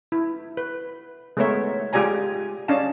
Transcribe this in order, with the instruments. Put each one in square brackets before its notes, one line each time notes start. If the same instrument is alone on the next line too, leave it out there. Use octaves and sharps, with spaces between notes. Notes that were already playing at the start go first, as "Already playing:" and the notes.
[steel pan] E4
B4
G#3 A3 B3 A#4 C#5 E5
G#3 F4 G4 D5 G#5 A#5
C#4 D4 D#5 F5 A5